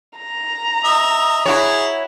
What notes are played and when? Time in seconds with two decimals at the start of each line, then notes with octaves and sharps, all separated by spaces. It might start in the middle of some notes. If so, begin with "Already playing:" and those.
0.16 A#5
0.84 D#5 E5
1.46 E4 F#4 G#4 C#5